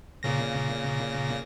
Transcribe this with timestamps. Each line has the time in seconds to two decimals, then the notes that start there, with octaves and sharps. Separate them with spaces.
0.23 A#2 C#3 A#6